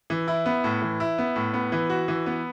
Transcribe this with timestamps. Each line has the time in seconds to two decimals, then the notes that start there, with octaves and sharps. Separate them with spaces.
0.10 E3
0.28 E4
0.46 B3
0.64 A2
0.82 E3
1.00 E4
1.18 B3
1.36 A2
1.54 B3
1.72 E3
1.90 F#4
2.08 E3
2.26 B3